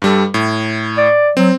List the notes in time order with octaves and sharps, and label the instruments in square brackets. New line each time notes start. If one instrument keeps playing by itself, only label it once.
[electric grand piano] G2 G3 A4
A2
[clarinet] D5
[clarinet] F#3 [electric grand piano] C4